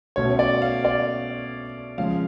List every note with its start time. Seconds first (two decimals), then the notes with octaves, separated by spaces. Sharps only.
0.16 B2 A3 C#4 C#5
0.31 C#5
0.39 D5
0.62 F5
0.85 D5
1.98 C#3 F3 G#3 C#4 F5